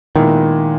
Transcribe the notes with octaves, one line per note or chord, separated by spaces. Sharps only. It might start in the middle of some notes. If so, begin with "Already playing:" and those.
A#2 D#3 G#3 B3 E4